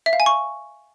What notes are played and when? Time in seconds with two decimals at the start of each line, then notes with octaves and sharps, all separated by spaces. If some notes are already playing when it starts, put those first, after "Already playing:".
0.06 E5
0.13 F5
0.20 G#5
0.26 C#6